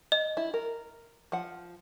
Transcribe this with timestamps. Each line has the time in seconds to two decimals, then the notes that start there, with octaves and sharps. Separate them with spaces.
0.12 D#5
0.37 E4
0.54 A#4
1.32 F3 F#5